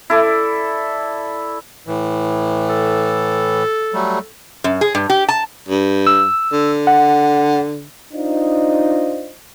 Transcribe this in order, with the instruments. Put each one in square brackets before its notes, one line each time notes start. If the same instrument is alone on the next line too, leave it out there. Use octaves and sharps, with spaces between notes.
[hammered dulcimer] E4 A4 D5
[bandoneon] A2 E3
[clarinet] A4
[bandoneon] F#3 G3 A3
[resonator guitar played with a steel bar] F#2
G#4
G2
G4
A5
[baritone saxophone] G2
[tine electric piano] E6
[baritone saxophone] D3
[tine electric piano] F#5
[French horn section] D4 D#4 F4 C5 D#5